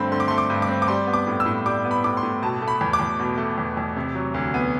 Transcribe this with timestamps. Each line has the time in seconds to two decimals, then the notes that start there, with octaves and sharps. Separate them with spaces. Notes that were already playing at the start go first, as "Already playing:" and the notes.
Already playing: G2 D3 A3 C4 B5 C6
0.12 D3 C6
0.20 D6
0.28 A3 C6
0.38 D6
0.50 G2
0.62 D6
0.69 C4
0.82 D6
0.88 G3 C6
1.07 B3
1.13 D6
1.27 A2
1.40 E6
1.46 A2
1.66 G3 D6
1.85 B3
1.91 B5
2.04 A2 D6
2.17 C6
2.23 A2
2.42 B2 A5
2.62 A3
2.68 B5
2.81 E2
2.93 D6
3.00 E2
3.20 B2
3.38 A3
3.58 E2
3.77 E2
3.96 C3
4.14 F#3
4.34 D2
4.54 B3